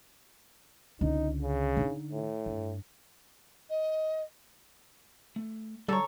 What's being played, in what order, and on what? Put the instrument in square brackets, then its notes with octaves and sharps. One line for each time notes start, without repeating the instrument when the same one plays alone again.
[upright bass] C#2 D3 [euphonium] D#4
[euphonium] C#3
[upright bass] D3 D#4
[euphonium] A2
[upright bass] G2
[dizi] D#5
[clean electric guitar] A3
[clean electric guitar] D3 A#5 [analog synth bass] G3 [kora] A4 C#5